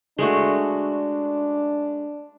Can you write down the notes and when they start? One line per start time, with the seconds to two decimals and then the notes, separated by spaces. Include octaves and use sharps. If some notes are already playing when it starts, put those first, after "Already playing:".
0.19 G#3 A3 D4 F#4